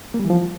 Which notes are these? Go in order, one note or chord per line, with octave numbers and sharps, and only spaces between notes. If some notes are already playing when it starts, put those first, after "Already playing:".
A#3
G3
E3
F3